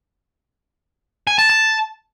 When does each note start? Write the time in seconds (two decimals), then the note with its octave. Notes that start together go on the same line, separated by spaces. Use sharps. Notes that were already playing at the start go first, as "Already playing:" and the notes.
1.27 G#5
1.39 A5
1.50 A5